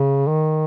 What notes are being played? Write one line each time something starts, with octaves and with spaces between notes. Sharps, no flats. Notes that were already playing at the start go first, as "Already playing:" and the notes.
Already playing: C#3
D#3